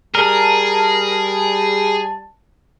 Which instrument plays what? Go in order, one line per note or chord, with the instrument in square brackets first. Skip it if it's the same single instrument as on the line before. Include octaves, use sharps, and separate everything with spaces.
[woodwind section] G3 A5 [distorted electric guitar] G#4 [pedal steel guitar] A#4